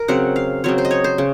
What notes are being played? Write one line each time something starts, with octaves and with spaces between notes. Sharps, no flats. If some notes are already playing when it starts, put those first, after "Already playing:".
Already playing: A#4
C#3 F#3 C4 F#5
F5
C#3 F#3 C4 C#5
C5
D#5
C#5
C5
C#3